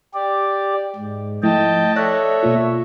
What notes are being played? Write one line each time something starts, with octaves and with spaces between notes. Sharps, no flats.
G4 D5
G#2
F3 A3 E4 D#5 G5 A5
A4 C#5 D5 E5 F#6 A#6
B2 A#3 F4